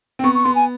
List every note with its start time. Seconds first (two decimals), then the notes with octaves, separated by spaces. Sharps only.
0.19 C4
0.24 B3 C#6
0.35 C#6
0.44 B3 C6
0.55 G#5